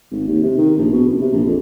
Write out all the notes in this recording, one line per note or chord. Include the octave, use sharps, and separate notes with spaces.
G#1
D#2
C3
D#3
A#1
B2
F#1
C3
A#1
F2